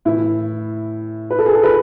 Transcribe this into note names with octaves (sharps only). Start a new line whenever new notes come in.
A2 E3 E4
B4
A4
G#4
A4
B4